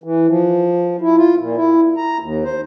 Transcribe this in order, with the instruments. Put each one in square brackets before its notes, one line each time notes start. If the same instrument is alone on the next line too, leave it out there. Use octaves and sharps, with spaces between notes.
[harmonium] E3
F3
E4
F4
A#2
E4
A#5
D#2
C5